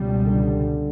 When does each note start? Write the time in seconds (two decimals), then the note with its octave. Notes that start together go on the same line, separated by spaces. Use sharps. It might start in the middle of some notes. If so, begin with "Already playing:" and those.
Already playing: C#2 B2 G3
0.25 D3